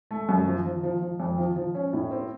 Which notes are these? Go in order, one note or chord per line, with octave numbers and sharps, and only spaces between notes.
A3
F#2
F3
F3
F3
F3
F2
F3
F3
C#4
A2
C4